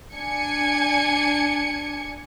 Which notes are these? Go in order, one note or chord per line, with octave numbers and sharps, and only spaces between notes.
D4 G#5 G#6 C#7